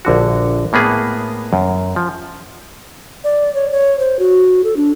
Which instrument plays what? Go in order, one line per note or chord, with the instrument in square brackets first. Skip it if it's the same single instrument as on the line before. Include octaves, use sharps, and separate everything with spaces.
[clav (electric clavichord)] A#1 D3 F#4
A2 A#3 B3 G#4
F#2
F3
[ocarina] D5
C#5
C#5
C5
F#4
A4
D4